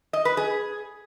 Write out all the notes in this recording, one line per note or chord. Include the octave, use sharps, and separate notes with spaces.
D#5
B4
G#4